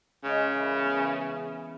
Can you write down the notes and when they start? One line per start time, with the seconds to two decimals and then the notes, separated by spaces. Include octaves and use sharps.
0.24 C#3 G#3
0.54 E3
0.82 B3